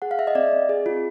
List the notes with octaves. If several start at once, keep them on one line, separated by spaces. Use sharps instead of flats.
G#4 F#5
F5
G#4 E5
D#5
C4 D5
C4
G#4
F4